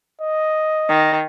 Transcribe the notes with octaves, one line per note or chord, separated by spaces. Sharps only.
D#5
D#3